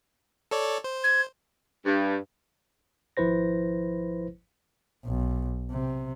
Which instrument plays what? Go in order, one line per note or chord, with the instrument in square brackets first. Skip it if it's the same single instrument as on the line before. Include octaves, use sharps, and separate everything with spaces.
[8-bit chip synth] A4 C#5 D5
C5
[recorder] G#6
[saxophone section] G2
[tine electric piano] G#1 F3 E4 B4 C5 A#6
[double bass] B1
C3